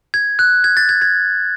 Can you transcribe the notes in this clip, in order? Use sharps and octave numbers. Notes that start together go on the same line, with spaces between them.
G#6
F#6
G#6
A6
G#6
G#6